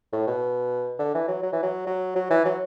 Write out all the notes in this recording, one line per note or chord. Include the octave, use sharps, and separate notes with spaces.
A2
B2
D3
E3
F#3
F#3
E3
F#3
F#3
F#3
E3
F#3